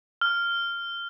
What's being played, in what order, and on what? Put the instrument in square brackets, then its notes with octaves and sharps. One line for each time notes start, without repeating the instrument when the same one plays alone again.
[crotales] F6